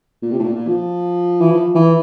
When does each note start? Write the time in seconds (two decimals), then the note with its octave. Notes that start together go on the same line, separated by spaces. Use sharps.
0.23 A#2
0.32 C3
0.39 A2
0.44 A#2
0.55 A#2
0.68 F3
1.41 E3
1.51 F3
1.75 E3